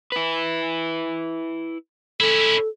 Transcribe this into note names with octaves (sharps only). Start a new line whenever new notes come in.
E4 B4
C#4 E4 A4